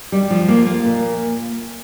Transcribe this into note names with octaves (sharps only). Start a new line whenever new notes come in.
G3
F3
A#3
A#3
A#2